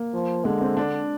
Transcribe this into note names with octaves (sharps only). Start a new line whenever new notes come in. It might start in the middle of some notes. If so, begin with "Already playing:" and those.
Already playing: A#3
F3
D3 G#3
C4
D4